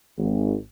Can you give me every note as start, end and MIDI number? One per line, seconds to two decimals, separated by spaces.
0.17 0.54 32